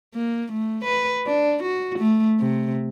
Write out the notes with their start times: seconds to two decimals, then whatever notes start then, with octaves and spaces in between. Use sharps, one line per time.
0.14 A#3
0.52 A3
0.84 B4
1.26 D4
1.63 F#4
1.99 A3
2.39 C3